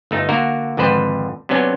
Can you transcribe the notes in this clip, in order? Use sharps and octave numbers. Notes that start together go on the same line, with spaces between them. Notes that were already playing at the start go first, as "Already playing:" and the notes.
G1 A3 D#4
D3 A#3 F#4 A#4
G#1 F2 D3 B4 C5
C3 F#3 B3 C#4 D4